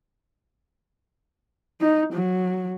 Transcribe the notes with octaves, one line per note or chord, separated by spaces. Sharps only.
D#4
F#3